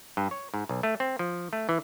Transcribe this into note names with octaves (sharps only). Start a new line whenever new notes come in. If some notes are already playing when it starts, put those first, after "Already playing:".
G2
C#5
G#2
B1
A3
C4
F3
A3
E3